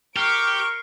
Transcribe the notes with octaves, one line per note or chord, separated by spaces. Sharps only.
G4 A#4 C#6 F6 C7 D7